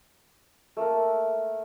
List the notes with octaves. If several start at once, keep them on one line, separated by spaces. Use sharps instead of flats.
A3 A#3 A4 A#4